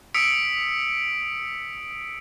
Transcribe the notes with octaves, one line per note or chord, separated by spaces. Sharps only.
D#6 E6 B6 C#7 D7